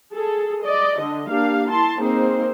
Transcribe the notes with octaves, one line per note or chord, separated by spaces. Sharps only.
G#4 A4
D5 D#5
D3 D#5
A#3 D4 G4 F5
E4 A5 C6
A#3 C4 D#4 G#4 C5